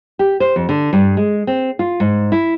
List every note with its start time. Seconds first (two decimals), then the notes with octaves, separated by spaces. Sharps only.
0.19 G4
0.40 C5
0.56 F2
0.69 D3
0.93 G2
1.17 G#3
1.47 C4
1.79 F4
2.00 G#2
2.32 E4